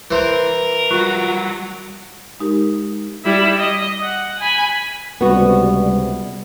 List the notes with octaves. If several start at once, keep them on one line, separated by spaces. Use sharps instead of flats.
E3 A#4 C5
F#3 G3 F4 F#4 C#6 F#6
G#3 D#4 G4 A#4
G3 E4
D#5
F#5
G#5 B5
C#2 C3 G3 B3 F#4